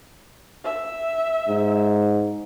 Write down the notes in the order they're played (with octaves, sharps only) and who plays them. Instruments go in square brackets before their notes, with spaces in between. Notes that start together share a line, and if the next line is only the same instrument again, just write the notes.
[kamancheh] E5
[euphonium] G#2